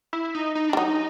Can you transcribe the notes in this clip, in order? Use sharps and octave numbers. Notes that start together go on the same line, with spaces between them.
E4
D#4
D#4
D4
G3
F#3 D#4